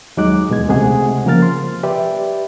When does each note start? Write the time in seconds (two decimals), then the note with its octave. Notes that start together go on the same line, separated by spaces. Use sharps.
0.17 D#2 F#3 G#3 D#4 D6 F#6
0.49 E2 B2 G#3 G#6
0.68 C#2 C3 G#3 A3 G#4 F#5
1.25 C#3 F3 A#3 A#4 F6 A6
1.42 C6
1.83 G4 B4 D5 E5 G5